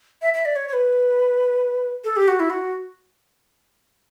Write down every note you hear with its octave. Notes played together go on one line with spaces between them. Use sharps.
E5
E5
D5
C#5
C#5
B4
A4
G4
F#4
E4
F#4